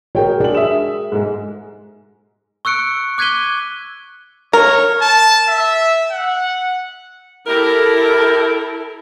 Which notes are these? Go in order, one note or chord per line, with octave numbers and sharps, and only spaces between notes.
F#4 G#4 A#4 C#5 G5
D4 G#4 F#7
E5 D#6 E7
G#2 G#3
C#6 E6 F#6 C#7 D7
D6 F#6 G#6 B6 D#7 G7
A#4 C#5
A5
E5
F#5
E4 G4 A4 A#4